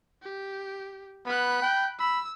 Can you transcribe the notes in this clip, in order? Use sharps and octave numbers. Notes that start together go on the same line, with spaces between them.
G4
B3 B5 F#6
G5
B5 E6